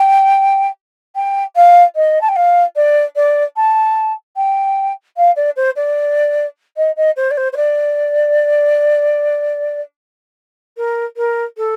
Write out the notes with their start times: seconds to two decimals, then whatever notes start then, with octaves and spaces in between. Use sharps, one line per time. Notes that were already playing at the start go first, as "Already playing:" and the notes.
Already playing: G5
1.16 G5
1.56 F5
1.96 D#5
2.21 A5
2.28 G5
2.36 F5
2.76 D5
3.16 D5
3.56 A5
4.36 G5
5.17 F5
5.36 D5
5.56 C5
5.76 D5
6.77 D#5
6.96 D#5
7.16 C5
7.31 D5
7.37 C5
7.53 C5
7.56 D5
10.77 A#4
11.17 A#4
11.57 A4